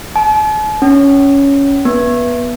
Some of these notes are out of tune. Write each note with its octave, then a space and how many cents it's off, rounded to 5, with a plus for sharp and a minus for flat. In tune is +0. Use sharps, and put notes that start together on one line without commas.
A5 -45
C#4 +10
B3 -20